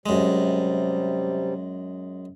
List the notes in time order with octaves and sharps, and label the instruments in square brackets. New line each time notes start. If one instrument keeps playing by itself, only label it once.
[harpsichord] F#2 G#3 [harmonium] C3 G3